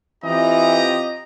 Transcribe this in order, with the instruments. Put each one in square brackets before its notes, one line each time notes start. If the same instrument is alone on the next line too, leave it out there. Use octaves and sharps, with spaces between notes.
[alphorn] E3 [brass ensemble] C4 F4 G4 [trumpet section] D#5 [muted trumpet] A#5